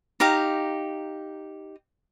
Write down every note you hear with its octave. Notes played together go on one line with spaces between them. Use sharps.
D#4 G4 F5 A#5